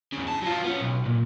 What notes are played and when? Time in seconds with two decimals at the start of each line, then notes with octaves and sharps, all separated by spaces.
0.13 E2 C#3
0.28 A2 A5
0.42 F#3 F4
0.64 B3 C#4
0.81 B1
1.06 A#2